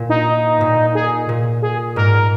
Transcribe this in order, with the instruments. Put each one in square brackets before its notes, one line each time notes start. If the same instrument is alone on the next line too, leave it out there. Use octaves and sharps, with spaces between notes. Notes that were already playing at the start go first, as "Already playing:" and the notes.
Already playing: [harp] A#2
[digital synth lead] D#4
[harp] A#2
[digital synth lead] G#4
[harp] A#2
[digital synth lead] G#4
[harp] G#2 [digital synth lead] A#4